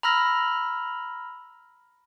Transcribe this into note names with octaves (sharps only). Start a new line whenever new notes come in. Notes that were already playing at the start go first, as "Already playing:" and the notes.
A#5 B5 E6 F6 A#6